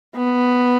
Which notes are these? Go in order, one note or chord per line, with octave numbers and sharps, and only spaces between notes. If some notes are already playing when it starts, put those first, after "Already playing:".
B3